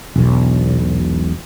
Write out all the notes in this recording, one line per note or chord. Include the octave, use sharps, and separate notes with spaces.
E1 B1